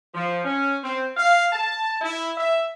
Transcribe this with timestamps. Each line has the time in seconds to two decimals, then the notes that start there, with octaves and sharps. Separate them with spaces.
0.14 F3
0.44 C#4
0.83 C4
1.17 F5
1.52 A5
2.01 E4
2.37 E5